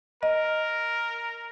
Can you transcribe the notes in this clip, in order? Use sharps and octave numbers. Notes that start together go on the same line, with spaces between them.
A#4 D#5